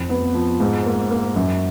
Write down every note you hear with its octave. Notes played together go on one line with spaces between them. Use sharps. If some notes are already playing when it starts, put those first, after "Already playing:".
Already playing: F2
B3
F3
G#2
A#3
A#3
F#2